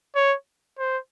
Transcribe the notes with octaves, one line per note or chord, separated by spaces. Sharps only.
C#5
C5